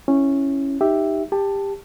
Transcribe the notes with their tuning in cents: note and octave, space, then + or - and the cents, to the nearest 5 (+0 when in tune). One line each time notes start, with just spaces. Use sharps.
C#4 -10 E4 +0
D#4 +0 G4 +0 E5 +0
G4 +20 A5 +5